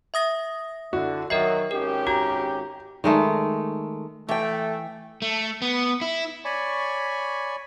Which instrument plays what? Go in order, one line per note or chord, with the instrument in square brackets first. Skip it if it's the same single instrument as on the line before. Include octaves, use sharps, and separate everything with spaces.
[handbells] E5 D#6 A#6
[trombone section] D3 [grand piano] E4 F#4
[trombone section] D#3 F#3 [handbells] A#4 D#5 E5 [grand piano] C7
[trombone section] G#1 C#4 G4 [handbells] A#4
[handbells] F#4 [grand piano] A#5
[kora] D#3 G#3 A3
[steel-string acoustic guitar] E3 G5 [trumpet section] A3
[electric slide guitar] A3
B3
E4
[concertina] C#5 D5 G#5 B5 C#6